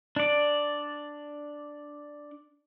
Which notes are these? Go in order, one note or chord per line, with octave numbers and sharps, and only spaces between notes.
D4 D5